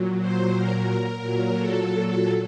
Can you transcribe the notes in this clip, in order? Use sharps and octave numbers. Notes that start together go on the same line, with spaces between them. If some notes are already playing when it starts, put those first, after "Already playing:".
Already playing: A#2 F#3
C5
A#4
A#2 F#3
A4